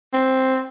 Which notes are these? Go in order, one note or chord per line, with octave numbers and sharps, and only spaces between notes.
C4